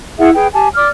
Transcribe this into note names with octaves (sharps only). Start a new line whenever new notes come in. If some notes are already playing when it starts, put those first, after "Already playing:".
E4 G#4 E5 F#5
G#4 B4 G5
G4 G#5 A5
D5 D6 F6